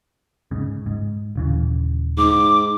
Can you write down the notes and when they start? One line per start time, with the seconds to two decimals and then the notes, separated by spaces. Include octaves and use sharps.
0.51 G#2 C#3
0.86 G#2
1.35 D#1 C#3 E3
2.18 G#2 D6